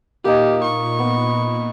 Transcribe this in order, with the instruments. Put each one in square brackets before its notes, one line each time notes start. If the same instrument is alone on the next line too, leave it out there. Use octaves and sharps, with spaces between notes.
[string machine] A#2 [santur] A#3 D#4 [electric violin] G4
[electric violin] C#6
[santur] B3